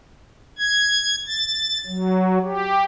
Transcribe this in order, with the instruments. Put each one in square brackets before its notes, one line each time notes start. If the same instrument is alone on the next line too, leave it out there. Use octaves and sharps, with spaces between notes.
[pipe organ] G#6
A6
F#3
G4